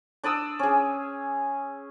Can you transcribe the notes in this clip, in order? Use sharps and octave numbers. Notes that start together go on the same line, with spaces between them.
D4 D5 D#6 E6
C#4 G#4